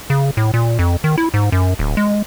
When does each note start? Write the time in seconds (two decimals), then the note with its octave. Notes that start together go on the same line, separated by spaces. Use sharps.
0.10 C#3
0.37 A2
0.54 A#2
0.79 F2
1.04 D#3
1.18 E4
1.34 G#2
1.52 F#2
1.79 D1
1.97 G#3